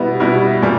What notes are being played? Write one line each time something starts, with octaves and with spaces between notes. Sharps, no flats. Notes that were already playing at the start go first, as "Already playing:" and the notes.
Already playing: B2 G3 B3 E4
B2 G3 B3 E4
A#2 G3